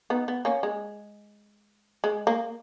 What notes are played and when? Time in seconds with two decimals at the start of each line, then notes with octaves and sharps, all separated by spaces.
0.10 B3 D#4
0.28 B3
0.45 A#3 C#4
0.63 G#3
2.04 G#3
2.27 A#3